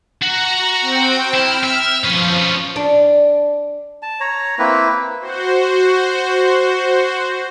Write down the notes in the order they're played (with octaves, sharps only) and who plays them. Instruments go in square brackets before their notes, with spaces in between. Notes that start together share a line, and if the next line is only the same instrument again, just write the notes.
[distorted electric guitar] F#4 [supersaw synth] A#5
[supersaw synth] C4 G5
[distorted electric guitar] E4 [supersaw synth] F6
[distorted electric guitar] E5
[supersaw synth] F3 [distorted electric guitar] C#4 B4
[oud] D4
[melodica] A5
C#5 A#5
A#3 C4 E4 B4
[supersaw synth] F#4 C5